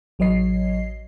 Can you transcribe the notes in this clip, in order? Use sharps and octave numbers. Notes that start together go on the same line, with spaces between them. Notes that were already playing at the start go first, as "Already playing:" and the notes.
A1 F#3 C#5 D#5 C7